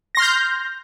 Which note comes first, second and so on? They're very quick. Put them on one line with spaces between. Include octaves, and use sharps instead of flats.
A#6 C6 F6 G6